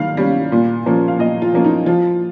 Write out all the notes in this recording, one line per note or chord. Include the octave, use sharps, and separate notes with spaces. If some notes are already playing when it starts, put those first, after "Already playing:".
Already playing: D#3 G3 F5
G3 C#4
A#2
F3 A#3 C#4
F5
A#2 D#5
F4
F3 A#3 C#4
D#4
F3 F4